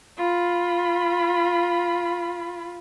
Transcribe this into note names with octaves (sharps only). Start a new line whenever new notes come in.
F4 B5